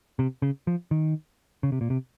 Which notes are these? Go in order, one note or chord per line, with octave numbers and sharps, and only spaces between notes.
C3
C#3
F3
D#3
C#3
C3
A#2
C3